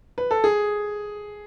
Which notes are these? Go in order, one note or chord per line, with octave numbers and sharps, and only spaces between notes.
B4
A4
G#4